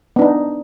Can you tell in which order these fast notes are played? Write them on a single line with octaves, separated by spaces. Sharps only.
B3 D4 D#4